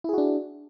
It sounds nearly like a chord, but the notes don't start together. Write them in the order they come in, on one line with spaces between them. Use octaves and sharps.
E4 G#4 F#4 D4